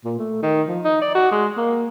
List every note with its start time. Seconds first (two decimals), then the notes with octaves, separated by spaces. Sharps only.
0.05 A#2
0.19 A3
0.43 D#3
0.68 F3
0.84 D#4
1.02 D5
1.15 F#4
1.32 G#3
1.57 A#3